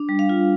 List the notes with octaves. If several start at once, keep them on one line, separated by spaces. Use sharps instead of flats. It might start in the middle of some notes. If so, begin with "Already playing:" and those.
Already playing: D4
G3
F5
F4